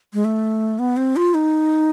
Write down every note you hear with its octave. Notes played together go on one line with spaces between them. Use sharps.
G#3
A3
B3
C4
F4
D#4